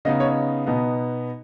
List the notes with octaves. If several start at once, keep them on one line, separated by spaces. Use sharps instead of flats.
C#3 B3 D#4 D#5
C#5
B2 B3 D#4